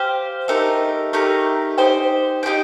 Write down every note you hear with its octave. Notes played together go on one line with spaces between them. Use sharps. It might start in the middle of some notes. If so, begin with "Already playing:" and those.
Already playing: G4 C5 F5
A3 D#4 G4 A#4
A3 D#4 G4 A#4
D#4 G4 C5 G5
D#4 G4 C5 G5